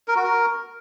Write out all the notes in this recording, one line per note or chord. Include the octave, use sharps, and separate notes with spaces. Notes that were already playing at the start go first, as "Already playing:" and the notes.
A#4
F#4
A#4